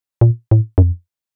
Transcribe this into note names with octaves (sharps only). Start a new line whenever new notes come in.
A#2
A2
F#2
F2